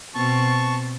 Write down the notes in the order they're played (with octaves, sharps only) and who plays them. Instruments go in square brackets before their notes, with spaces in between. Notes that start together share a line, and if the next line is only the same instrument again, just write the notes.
[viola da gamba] B2 C4 [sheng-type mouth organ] A5 C#6